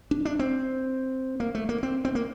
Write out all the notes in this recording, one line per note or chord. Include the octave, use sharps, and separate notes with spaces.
D4
D4
C4
A#3
A3
A#3
C4
C4
A#3